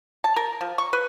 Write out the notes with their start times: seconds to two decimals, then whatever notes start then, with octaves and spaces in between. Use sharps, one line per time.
0.24 A5
0.36 A#4
0.61 F3
0.78 C#6
0.93 B4